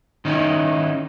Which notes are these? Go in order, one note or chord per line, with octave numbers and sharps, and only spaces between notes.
D#3 C#4 D#4 E4